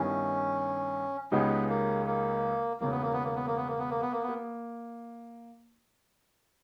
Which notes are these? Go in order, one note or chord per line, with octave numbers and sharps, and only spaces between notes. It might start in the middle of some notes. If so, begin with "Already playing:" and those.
Already playing: G2 D#3 G3 B3 C#4 E4
C#2 C#3 G#3 B3 D#4 G4
A#3
A#3
E1 D#2 C#3 A#3
B3
A#3
B3
A#3
B3
A#3
B3
A#3
B3
A#3
B3
A#3
B3
A#3